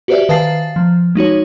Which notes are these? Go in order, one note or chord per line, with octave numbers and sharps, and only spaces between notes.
F#4 G4 B4 C5 D5 E5
D#3 B4 F5 A5 A6 C7
F3
G#3 D#4 F#4 C#5